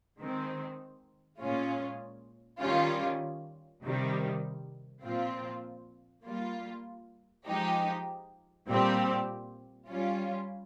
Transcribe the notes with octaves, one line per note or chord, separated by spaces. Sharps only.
D#3 G#3 C4
A#2 G#3 C#4 F4
D#3 G3 C#4 F4
C3 D#3 G3
A#2 F3 C4 F4
G3 A#3 F4
F3 G#3 D#4 G4
A#2 G3 C4 G4
G3 C#4 F4